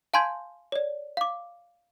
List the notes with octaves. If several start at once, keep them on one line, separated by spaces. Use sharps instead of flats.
F5 G#5 A5 C6 G6 G#6
C#5 D5
F5 D6